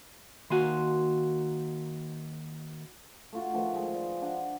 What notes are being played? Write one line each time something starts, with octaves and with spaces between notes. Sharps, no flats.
D#3 A#3 F#4 G#5 C6
A3 F4 F#4
D#3 F3 A3 B4
G#3
D5
D4 F#5 C6